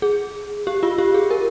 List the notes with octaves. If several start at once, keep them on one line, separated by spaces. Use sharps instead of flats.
G#4
G4
F4
G4
G#4
A#4